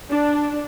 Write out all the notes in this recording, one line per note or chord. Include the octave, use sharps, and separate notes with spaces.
D4